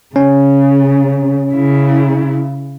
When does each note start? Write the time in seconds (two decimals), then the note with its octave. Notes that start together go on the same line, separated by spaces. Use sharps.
0.16 C#3 C#4
1.52 C#3 E4